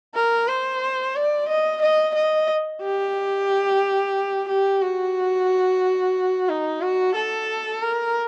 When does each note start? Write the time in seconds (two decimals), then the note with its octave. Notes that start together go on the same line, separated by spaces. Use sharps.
0.15 A#4
0.48 C5
1.15 D5
1.48 D#5
1.82 D#5
2.15 D#5
2.82 G4
4.48 G4
4.82 F#4
6.49 D#4
6.82 F#4
7.15 A4
7.82 A#4